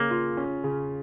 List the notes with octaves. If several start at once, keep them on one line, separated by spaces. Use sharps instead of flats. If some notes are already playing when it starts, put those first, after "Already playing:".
Already playing: C#3 A#3 C#4
F4
C#4
C#3